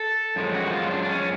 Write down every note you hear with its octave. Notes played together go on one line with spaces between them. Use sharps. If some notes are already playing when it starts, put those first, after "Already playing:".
Already playing: A4
F#2 F3 G#3
F#4
F4
D4
D4
C#4